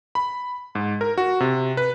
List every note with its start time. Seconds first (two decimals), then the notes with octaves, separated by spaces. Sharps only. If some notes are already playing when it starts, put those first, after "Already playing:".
0.15 B5
0.75 G#2
1.01 A#4
1.18 F#4
1.40 C3
1.77 B4